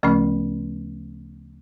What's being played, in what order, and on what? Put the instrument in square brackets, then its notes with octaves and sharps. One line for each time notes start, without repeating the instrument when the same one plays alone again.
[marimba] D2 C#3 F3 A3 C#4